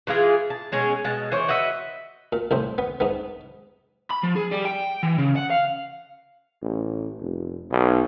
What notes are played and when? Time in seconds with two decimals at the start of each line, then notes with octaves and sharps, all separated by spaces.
0.07 E3 G#3 F4 G#4
0.50 A5
0.72 B2 G#3 C#4 G#4
1.04 B2 G#3 A5
1.32 E3 C5 C#5
1.48 F#4 B4 D#5 E5
2.32 A#2
2.51 C2 A2 C5
2.78 B3
3.00 G#2 B3
4.10 B5
4.23 F3
4.35 G#4
4.51 G3
4.65 G5
5.03 E3
5.18 C#3
5.36 F#5
5.50 F5
6.62 A1
7.20 F1
7.71 B1